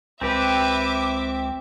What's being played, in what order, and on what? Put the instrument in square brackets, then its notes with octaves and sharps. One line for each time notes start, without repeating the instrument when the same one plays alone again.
[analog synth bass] C#2 [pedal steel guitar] C4 G4 [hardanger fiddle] B4 [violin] E5 D6